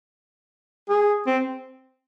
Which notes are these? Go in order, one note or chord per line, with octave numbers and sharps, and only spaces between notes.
G#4
C4